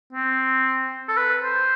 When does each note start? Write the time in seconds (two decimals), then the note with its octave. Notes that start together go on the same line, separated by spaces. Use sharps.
0.13 C4
1.08 A4
1.17 B4
1.43 C5